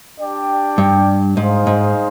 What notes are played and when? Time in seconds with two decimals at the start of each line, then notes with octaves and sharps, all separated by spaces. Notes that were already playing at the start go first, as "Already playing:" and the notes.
0.18 D4 G4 D5 G5
0.78 G2
1.37 G#2 D#4 G#4 C5 F5
1.67 G#2